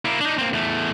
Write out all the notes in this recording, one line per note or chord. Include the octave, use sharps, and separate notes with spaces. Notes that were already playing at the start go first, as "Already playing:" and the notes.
A#3 E4
D4 D#4
A#3 C4
E2 A3